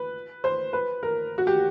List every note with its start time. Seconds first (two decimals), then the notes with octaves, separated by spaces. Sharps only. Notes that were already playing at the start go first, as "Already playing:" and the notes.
Already playing: B4
0.44 C5
0.73 B4
1.03 A#4
1.38 F#4
1.47 G4